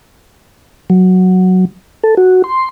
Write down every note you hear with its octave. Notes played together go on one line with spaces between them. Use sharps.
F#3
A4
F#4
C6